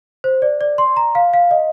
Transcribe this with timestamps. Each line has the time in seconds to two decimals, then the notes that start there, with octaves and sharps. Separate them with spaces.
0.24 C5
0.42 D5
0.61 D5
0.78 C6
0.97 A#5
1.15 F5
1.34 F5
1.51 D#5